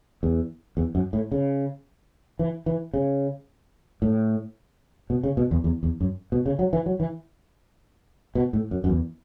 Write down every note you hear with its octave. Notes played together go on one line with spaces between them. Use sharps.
E2
E2
F#2
A2
C#3
E3
E3
C#3
A2
B2
C#3
B2
E2
E2
E2
F#2
B2
C#3
F#3
E3
F#3
E3
B2
A2
F#2
F#2
E2